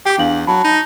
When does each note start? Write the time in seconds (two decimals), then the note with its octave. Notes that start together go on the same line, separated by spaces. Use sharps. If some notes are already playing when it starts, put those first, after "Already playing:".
0.06 G4 G5 D6
0.18 E2 D4 F5 F#7
0.47 F#3 A5 B5
0.64 D#4